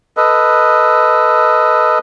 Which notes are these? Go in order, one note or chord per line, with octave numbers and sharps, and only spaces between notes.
A4 B4 D#5